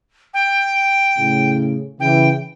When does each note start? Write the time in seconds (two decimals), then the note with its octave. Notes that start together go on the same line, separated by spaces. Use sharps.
0.34 G5
1.17 A2 C#3
2.00 C#3 E3 G5